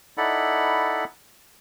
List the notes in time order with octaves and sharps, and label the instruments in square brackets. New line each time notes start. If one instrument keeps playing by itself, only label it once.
[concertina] D#4 E4 A4 D5 F#5 B5